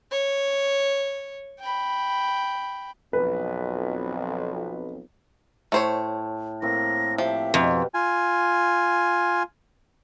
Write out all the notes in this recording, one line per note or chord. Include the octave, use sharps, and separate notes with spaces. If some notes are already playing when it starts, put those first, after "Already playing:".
C#5
G5 B5
B1 F2 B4
A2 A3 C5 C#5
A2 A#3 C4 A#6
F3 G4 E5
F2 B2
F4 G#5